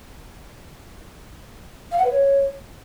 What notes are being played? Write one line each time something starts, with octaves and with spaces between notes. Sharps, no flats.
F5
F#5
B4
C#5